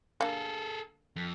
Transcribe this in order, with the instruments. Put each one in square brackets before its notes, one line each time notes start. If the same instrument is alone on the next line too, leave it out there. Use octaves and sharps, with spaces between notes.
[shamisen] D3 A#3 [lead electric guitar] G#4 A4
[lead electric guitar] F2